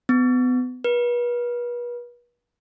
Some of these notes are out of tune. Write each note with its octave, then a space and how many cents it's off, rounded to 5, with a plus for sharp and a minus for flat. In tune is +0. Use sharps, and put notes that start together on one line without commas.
B3 +30
B4 -40